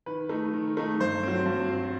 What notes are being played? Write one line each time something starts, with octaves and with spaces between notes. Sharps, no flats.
D#3 B4
A3 D#4
D#3
A3 D#4
G2 C5
F#3 C4
G2
F#3 C4